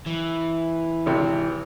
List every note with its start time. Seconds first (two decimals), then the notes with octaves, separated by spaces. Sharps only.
0.06 E3
1.06 G#1 C3